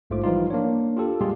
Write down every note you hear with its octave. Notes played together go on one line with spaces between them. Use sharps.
A#1 G#2 A3 F4 C5 D6
E3 F3 G3 D#4 F4
A#3 D4 C#5
F4 G4 A4
A#2 G3 G#3 F4 G4 G#4